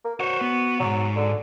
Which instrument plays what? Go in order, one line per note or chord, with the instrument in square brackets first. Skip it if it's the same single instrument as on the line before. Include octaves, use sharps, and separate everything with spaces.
[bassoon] A#3
[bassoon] F#4 [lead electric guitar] C5 C#5
[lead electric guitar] B3
[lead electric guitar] B1 G#2 [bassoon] F#3
[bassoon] D3